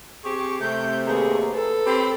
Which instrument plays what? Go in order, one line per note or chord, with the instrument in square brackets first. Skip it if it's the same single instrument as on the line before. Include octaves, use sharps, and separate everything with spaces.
[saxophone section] C4 G4 G#4 [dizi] C#6
[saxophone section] C3 A3 [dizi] G6
[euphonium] D#2 [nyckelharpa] G#4 B4 [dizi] A#5
[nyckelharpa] A4 [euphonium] B4
[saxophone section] C4 G4 [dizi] B5